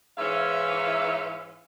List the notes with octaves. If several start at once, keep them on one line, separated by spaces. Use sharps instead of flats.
G#2 E3 C#4 E5 F5